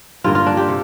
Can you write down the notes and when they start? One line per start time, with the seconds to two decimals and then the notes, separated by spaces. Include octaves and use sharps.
0.24 G2 D3 A#3 F4
0.35 F4
0.46 D4
0.57 G4
0.68 C3